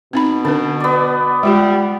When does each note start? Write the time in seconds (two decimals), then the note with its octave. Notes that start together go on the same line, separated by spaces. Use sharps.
0.13 B2 C4 D#4 B5
0.45 D3 D4 B4 A5
0.80 B3 D5
1.43 G3 G#3 F4 G4